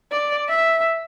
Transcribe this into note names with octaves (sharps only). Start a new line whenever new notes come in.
D5
E5